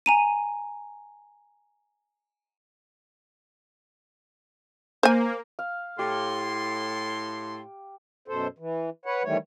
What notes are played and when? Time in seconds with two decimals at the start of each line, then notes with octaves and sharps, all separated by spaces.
0.06 G#5 A#5 D#7
5.03 A#3 C5 G#5
5.59 F5
5.99 A2 G4 C6
8.28 F#2 B2 A4 C5
8.58 E3
9.05 B4 C#5 F#5
9.24 D#3 E3 G3 A3 C#5